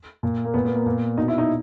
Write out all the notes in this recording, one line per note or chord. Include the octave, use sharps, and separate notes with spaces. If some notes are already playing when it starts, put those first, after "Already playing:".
A#2
A#3
A#2 B3
B3
A#3
A#2 B3
B2 D#4
E4
D#4